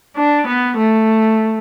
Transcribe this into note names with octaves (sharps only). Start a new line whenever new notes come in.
D4
B3
A3